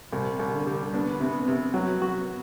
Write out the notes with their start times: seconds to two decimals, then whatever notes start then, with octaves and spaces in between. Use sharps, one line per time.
0.12 C2 C3
0.39 C2
0.52 D3
0.66 G3
0.93 B3 D4
1.20 C3
1.48 C3
1.73 F#3 B3
2.02 F#4